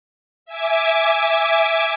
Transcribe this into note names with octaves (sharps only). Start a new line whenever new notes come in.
E5 G#5 D6